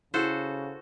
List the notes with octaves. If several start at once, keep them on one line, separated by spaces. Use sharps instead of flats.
C#3 E4 F#4 G#4 A4 C5